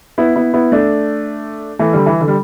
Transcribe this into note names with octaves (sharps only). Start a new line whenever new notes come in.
B3 E4
B3 E4
B3 E4
A3 D4
E3 A3
D3 G3
E3
D3
G3